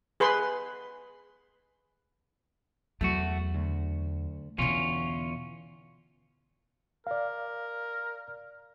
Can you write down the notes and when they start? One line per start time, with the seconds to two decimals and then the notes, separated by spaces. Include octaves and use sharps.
0.20 G#4 B4 B5 C6
3.01 E2 F#3 A3 F#4
3.55 D2
4.58 E2 B2 D3 C#4 F4
7.07 A#4 D5 F5